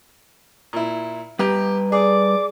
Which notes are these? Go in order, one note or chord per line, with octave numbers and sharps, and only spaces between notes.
A#2 E4
G3 G4 B4 A#5
G#4 D5 D6